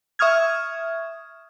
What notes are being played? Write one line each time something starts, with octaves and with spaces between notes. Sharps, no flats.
E5 C#6 D#6 F6 G#6